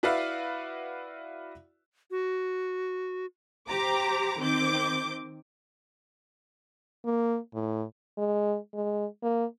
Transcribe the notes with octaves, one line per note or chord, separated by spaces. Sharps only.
E4 F#4 B4 D5 E5 F5
F#4
G4 C5 A#5 D6
D#3 C4 D6 G6
A#3
A2
G#3
G#3
A#3